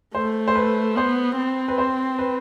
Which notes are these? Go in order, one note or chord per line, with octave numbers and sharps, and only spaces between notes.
A3 C5
C5
B4
B3 C5
C4
B4
C5
B4